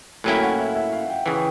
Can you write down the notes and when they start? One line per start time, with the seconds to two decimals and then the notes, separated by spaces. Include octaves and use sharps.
0.24 A2 F#3 A#3 C#4 E4 G5
0.41 F#5
0.59 E5
0.75 E5
0.93 F5
1.10 G5
1.26 C#3 E3 G#5
1.34 G5